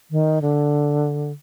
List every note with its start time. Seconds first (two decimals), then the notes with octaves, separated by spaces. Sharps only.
0.11 D#3
0.42 D3